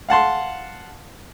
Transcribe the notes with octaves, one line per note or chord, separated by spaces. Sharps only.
F5 F#5 A5 C6